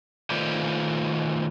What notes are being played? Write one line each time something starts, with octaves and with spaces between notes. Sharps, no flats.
D#3 A3 F4 B4 C5 D5